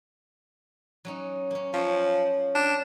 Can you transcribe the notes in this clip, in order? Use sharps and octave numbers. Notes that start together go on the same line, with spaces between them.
F#3 C#4 D#4
A#3 C#4
F3 C#4 C#5 D5
D4